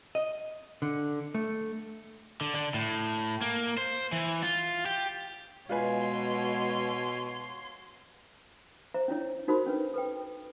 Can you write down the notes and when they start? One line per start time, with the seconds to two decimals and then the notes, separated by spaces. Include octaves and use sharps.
0.15 D#5
0.82 D3
1.34 A3
2.41 D3
2.55 D3
2.74 A2
3.41 A#3
3.77 C5
4.12 E3
4.43 F4
4.86 G4
5.69 B2 G#3 F4 B4 C#5 G#5 C6
8.94 C5 E5 A#5
9.08 C#4 D4 E4 C#5
9.48 D#4 F#4 A#4 C5 B5
9.67 C#4 D4 B4
9.94 A4 B4 G5